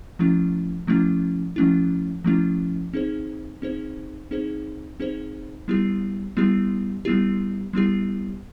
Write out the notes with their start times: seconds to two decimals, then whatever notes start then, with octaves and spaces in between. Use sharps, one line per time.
0.19 F3 A3 C#4 E4
0.87 F3 A3 C#4 E4
1.56 F3 A3 C#4 E4
2.24 F3 A3 C#4 E4
2.93 C4 D#4 G#4 C5
3.62 C4 D#4 G#4 C5
4.31 C4 D#4 G#4 C5
5.00 C4 D#4 G#4 C5
5.68 G3 B3 E4 G4
6.37 G3 B3 E4 G4
7.05 G3 B3 E4 G4
7.73 G3 B3 E4 G4